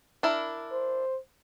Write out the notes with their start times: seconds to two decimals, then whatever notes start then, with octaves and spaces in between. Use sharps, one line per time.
0.23 D4 E4 A#4
0.71 C5